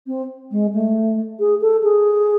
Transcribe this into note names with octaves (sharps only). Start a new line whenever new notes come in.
C4
G#3
A3
G#4
A4
G#4